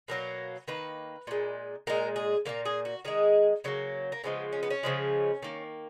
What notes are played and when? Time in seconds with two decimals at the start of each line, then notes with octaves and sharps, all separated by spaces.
0.08 B2 F#3 A#3 A#4
0.68 D#3 A#3 B4
1.27 A#2 G#3
1.87 A#2 G#3 A#4
2.16 G#4
2.45 A#2 F#3 A#3 A#4
2.65 G#4
2.85 F#4
3.05 D#3 G#3 G#4
3.64 C#3 F#3 A#3 B3
4.12 A#3
4.24 C#3 F3 G#3 B3
4.52 C#4
4.63 B3
4.70 C#4
4.83 C#3 F3 G#3
5.43 D#3 A#3